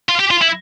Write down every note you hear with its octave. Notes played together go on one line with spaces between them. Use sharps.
F4
G4
F4
E4